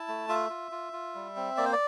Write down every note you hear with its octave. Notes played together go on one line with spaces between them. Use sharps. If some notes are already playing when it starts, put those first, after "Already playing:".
Already playing: E4 A5
A3
F4 E5
F4
F4
F4
G3
C4
A#3 D5
C5
D5